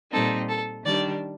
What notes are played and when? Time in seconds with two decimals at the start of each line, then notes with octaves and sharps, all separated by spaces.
0.12 A#2 G3 C4 D#4 A4
0.48 A4
0.85 D#3 G3 D4 D5